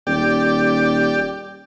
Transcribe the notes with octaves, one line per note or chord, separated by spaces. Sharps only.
D#1 G4 D5